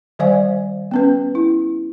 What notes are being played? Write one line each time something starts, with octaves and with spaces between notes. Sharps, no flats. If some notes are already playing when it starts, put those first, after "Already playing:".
D#3 G3 C5 D5 F5 G#5
B3 C#4 B4
E4